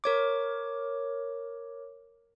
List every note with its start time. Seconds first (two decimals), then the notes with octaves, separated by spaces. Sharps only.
0.04 A#4 C#5 D6